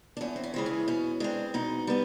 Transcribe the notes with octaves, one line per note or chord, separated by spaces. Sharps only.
D4
E2 C#4
C4
C#4
C#3 E3 G#3 C4
C#4
B2 C#4
G#3 C4 D4
B2 D#4
G3 B3